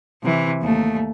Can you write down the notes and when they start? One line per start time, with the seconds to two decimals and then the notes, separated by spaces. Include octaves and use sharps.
0.23 C3 E3
0.62 D#2 A3